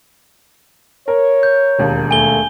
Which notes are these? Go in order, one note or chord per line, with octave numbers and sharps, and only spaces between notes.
A#4 C#5
G6
E1 D#2
A3 G#5 G7